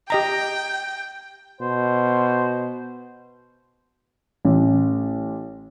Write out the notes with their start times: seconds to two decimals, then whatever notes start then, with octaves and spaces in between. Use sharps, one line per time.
0.10 G4 D#5 G5 A#5
1.61 B2 C5
4.45 A1